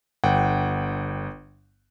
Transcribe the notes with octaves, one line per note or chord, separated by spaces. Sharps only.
G1 F#5 G5